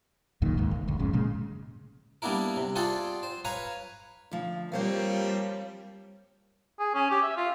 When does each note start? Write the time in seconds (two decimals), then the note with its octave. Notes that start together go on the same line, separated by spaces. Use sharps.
0.42 C#2 F#2 A#2 D#3
0.57 D1 D#2 G#2
0.71 G1
0.88 F#1 D2
0.99 F2 G#2 C#3
1.13 A#2 C#3 G#3
2.22 G3 A#3 B3 D4 E4 A#4
2.56 C3
2.76 F4 G#4 A4 D5 F#5 G5
3.23 C5
3.45 B4 C#5 F5 G#5 A#5
4.31 D2 F3
4.72 F3 G3 A#3 C4 C5 C#5 F5
6.79 G#4
6.94 C#4
7.10 G4
7.22 E5
7.37 F4